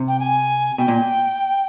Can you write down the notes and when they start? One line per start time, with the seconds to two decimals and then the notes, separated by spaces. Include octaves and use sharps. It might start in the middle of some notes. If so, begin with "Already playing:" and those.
Already playing: C3
0.08 G5
0.19 G#5
0.78 B2 G5
0.88 A#2